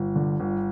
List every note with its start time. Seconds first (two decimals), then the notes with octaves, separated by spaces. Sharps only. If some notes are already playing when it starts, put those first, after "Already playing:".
Already playing: G1
0.16 D3
0.40 G1